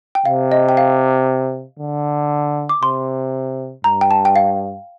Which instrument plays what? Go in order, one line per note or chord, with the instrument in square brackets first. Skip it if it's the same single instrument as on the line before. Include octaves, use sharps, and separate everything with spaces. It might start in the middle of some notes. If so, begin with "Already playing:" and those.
[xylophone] G5
[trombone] C3 [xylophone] F5
[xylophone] D#5
G5
F5
[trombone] D3
[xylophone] D6
[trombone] C3 [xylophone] C6
[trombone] G2 [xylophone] A#5
[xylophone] G5
A5
G5
F5